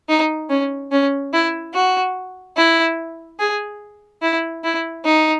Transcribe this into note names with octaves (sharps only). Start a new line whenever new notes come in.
D#4
C#4
C#4
E4
F#4
E4
G#4
E4
E4
D#4